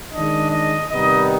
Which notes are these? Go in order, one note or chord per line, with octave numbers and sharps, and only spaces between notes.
D#3 G#3 D4 D#5
D#5
C3 D#3 G3 B3 D#4 D#5